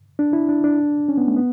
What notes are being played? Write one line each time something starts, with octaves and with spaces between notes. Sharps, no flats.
D4
E4
D4
D4
C#4
B3
A3
B3